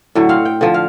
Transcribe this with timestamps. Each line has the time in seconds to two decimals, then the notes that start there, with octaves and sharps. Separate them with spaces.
0.15 A2 D3 F#3
0.29 C4 F5 F#5
0.45 G5
0.61 D3 F3
0.74 F5